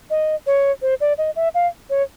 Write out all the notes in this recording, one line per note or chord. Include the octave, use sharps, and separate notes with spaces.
D#5
C#5
C5
D5
D#5
E5
F5
C#5